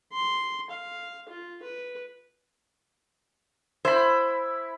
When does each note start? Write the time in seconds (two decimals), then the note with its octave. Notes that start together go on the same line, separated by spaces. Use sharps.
0.12 C6
0.70 F5
1.29 F4
1.63 B4
3.85 E4 C5 B5